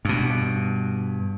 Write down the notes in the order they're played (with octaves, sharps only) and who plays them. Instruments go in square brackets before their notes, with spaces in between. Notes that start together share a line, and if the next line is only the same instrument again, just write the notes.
[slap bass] G2 B2